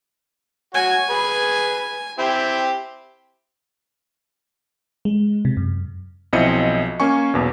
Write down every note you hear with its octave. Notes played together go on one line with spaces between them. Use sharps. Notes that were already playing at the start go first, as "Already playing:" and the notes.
F#4 C#5 G#5
G#4 B4
C4 E4 G4
G#3
C3
F#2
B1 F3 C4 E4 D#5 C#7
A#3 C#4 G#5 C#6
B1 E2 B2